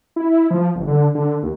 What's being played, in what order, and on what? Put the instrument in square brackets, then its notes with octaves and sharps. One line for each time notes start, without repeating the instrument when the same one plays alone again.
[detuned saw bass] E4
F3
G1
D3
D3
D#2